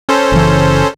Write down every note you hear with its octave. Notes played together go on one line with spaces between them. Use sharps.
C#4 A4 C5
F#1 C#3 E3